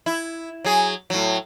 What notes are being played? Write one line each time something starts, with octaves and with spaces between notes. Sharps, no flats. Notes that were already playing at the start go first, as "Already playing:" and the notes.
E4
F#3 G#4
A2 F#3